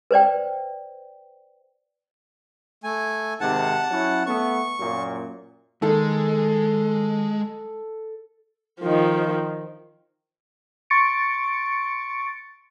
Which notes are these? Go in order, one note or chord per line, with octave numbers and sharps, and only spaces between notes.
B4 C5 D5 G5
A3 G#5
G#2 C3 D#3 F#5 A5
F#3 C#4 E4
A3 B3 C#6
F#2 A#2
D#3 G#3 A4 A5
D#3 F3
C6 C#6 A6 C#7 D7